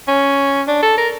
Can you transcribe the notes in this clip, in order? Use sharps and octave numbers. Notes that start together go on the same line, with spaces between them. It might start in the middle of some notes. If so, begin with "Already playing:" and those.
C#4
D4
A4
A#4